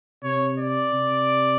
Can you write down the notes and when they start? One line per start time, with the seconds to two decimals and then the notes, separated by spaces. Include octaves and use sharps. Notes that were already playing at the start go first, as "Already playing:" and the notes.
0.24 C3 C#5
0.58 D5
0.93 C3